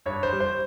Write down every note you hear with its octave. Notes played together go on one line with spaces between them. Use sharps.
G2 C#5
C5
G3
C5